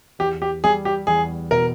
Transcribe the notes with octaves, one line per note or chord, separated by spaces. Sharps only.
E2 G4
G4
G3 G#4
G4
E2 G#4
B2 A#4